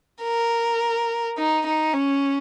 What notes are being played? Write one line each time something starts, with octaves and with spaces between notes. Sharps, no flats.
A#4
D#4
D#4
C#4